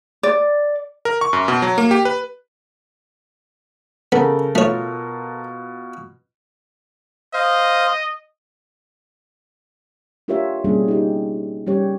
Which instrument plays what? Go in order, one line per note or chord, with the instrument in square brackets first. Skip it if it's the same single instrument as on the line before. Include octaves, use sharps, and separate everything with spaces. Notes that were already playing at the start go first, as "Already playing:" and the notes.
[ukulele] D5
[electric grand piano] A#4
C#6
F#2
B2
F#3
A#3
G4
B4
[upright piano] C#3 [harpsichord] B3 [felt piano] A4 A#4
[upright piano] B2 F4 [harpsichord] A3 C#5
[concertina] C5 F5 [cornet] D#5
[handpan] D4 F4 G4 A#4 C#5 E5
B2 G3 A#3 C#4 D4 G#4
D#4 G4
G3 C#4 G4 C#5